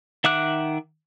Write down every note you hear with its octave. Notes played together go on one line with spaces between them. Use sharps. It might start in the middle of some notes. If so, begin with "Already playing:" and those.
D#3 E5 F#5 D6 F#6